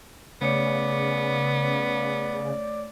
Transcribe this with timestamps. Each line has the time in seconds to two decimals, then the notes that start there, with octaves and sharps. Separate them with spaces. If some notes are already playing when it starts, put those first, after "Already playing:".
0.41 C#3 A3 B3 C#5 D5 C#7